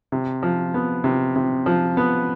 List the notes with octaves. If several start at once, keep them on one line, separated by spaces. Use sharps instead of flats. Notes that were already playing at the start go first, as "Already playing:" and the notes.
C3
F3
B3
C3
C3
F3
B3